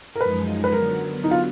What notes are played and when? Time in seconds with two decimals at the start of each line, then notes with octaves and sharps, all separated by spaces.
0.16 A#4
0.21 F#2 F3 G#3 D#4 B4
0.64 B4
0.72 D3 F#3 B3 A#4
1.24 D#4
1.31 F4